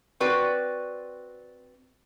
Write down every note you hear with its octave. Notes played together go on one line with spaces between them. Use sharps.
C4 F#4 B4 D5